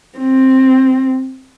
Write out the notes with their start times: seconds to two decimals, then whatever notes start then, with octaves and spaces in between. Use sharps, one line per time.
0.18 C4